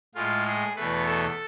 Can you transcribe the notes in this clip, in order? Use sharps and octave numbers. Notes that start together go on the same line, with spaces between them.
A2 G#3 F4
G#4
E2 B2 A3 B4
A4